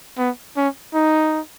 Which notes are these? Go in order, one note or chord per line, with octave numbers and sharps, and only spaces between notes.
B3
C#4
D#4